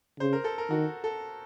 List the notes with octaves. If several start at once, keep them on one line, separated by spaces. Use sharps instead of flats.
C#3 C5
A#4
A4
A#4
D#3 F#4
A4